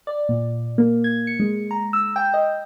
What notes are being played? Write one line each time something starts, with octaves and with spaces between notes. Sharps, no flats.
D5
A#2
A#3
G#6
C#7
G#3
A#5
E6
G5
D#5